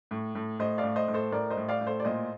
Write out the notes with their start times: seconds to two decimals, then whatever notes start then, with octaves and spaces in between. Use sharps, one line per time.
0.11 A2
0.35 A2
0.59 A2 C5 D#5
0.78 D5 F5
0.83 A2
0.96 C5 D#5
1.08 A2
1.14 A4 C5
1.32 A2 A#4 D5
1.50 C5 D#5
1.57 A2
1.68 D5 F5
1.81 A2
1.87 A4 C5
2.00 D5
2.05 A#2 C5 D#5